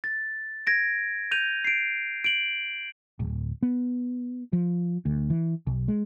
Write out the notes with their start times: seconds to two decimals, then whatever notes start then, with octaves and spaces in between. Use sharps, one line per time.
0.04 A6
0.67 G#6 A#6 D7
1.31 G6 D#7 F7
1.65 C7 D7
2.24 D7 F#7
3.19 D1
3.63 B3
4.53 F3
5.05 D2
5.30 E3
5.67 B1
5.88 G#3